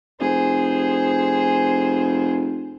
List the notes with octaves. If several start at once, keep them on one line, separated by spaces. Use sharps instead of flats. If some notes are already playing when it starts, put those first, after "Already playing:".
F1 G#4 C5